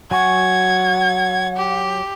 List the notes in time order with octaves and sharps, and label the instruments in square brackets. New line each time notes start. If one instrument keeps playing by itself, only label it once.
[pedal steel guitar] F#3 G#5 C#6 [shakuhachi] F#5 [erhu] G#6
[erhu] G4